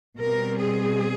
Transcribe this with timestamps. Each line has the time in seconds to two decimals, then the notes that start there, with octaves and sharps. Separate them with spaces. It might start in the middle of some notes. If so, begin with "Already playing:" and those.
0.18 B2 G3 C4 A#4
0.57 G#4